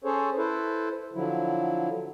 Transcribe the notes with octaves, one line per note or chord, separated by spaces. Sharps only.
C#4 G#4 A4 C5 C#5
E4 A4 B4 C5
D3 F3 F#3 E4